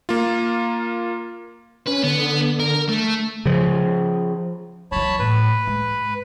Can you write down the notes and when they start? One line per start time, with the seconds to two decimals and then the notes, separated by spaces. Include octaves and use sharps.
0.09 A#3 F4
1.87 C#4 B4
2.04 D3 B3
2.60 A#4
2.89 A3
3.46 C#3 F3
4.92 E3 F#3 C#5 A5 B5
5.20 A2 B4
5.67 G#2